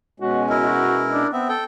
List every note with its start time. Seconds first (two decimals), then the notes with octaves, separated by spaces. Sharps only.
0.20 B2 G#3 C#4 F#4
0.50 E4 A#4
0.62 F#4
1.11 D4
1.33 B3 C4 E5
1.49 A4 G5